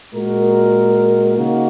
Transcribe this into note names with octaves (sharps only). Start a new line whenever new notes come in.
A#2 G#3 F#4 A#4
C#3 A#3 D#4 F#4 A#4